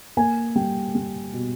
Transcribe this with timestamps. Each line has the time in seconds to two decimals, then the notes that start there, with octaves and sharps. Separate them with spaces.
0.17 A#3 G#5
0.55 G3 G5
0.95 G3
1.33 B2